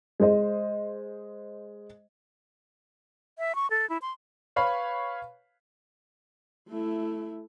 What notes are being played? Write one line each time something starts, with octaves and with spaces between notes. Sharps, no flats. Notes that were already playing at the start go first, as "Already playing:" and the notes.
G#3 C5 D#5
E5
C#6
A4
E4
C6
B4 C#5 F5 B5
A3 E4